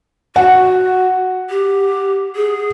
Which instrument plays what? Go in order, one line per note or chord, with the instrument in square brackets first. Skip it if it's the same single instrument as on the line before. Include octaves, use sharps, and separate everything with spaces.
[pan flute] F#4 [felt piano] F#5
[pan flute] G4
G#4